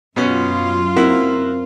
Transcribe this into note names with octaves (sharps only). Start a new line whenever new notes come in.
F#2 B2 B3 C#4 F4
A#3 C4 E4 F#4 A#4